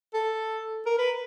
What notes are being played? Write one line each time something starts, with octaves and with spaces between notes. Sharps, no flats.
A4
A#4
B4